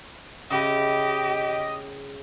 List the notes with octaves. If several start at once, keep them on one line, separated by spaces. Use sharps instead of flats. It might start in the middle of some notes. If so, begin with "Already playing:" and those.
C#3 E4 G4 D#5